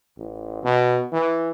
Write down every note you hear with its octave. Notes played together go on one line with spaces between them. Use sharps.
A1
B2
E3